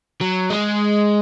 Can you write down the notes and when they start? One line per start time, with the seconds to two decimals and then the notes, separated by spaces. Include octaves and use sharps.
0.21 F#3
0.50 G#3